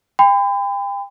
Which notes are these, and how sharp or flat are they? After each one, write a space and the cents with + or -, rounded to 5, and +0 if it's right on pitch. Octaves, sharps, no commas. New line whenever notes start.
G5 +35 B5 +40